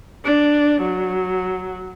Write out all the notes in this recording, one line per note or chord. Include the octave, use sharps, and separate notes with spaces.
D4
F#3